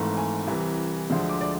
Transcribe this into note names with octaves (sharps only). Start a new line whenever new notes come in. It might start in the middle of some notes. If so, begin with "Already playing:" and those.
Already playing: G#1 G#2 E3 A3
G#5
C2 C3 E3
D2 D3 F3 G#3
D6
D5